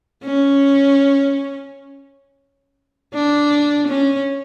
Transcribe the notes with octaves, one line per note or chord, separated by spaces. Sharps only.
C#4
D4
C#4